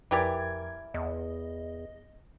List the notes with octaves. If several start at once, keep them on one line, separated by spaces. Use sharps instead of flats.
F2 E3 G4 A#4 D5 G#6
E2 D#5